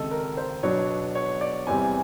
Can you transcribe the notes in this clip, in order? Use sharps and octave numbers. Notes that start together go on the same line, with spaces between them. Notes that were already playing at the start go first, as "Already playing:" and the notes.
Already playing: C#2 C3 D#3 A4 D#5
A#4
C5
B2 F#3 B3 D4 C#5
C#5
D5
E2 C3 E3 G3 C4 G#5